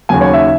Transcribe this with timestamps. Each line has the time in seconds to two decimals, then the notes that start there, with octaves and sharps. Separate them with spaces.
0.09 D#2 C#3 F#3 G#5
0.21 C#5
0.33 E5